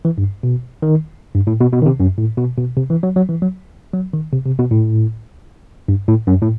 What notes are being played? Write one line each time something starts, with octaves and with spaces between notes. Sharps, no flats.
E3
G2
B2
D#3
G2
A2
B2
B2
D#3
C3
F#2
A2
B2
B2
C3
E3
F#3
F#3
E3
F#3
F#3
D#3
C3
C3
B2
A2
G2
A2
F#2
A2